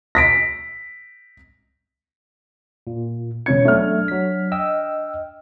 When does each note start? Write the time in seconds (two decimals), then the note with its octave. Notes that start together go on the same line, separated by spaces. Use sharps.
0.15 A#6 B6 D7
2.87 A#2
3.46 E1 C#4 G#6 C#7
3.65 F#3 A3 D4 F6
4.08 F#3 B6
4.52 D#5 G5 E6